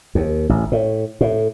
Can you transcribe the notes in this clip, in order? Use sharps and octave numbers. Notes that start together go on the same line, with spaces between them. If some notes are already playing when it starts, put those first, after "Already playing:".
D#2
A1
A2
A2